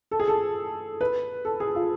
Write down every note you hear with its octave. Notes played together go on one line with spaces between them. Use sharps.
A4
G#4
A4
B4
A4
G#4
F4